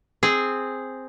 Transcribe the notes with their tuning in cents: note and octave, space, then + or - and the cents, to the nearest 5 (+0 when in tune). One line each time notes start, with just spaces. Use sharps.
C4 +0 G#4 +0